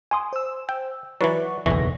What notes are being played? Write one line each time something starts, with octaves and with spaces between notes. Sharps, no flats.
G#5 C6 D#6
C5 E6
G5
E3 F#3 E4 B4 D5 F#5 C#6 A6
F#1 B1 E2 B2 E3 C#6 A#6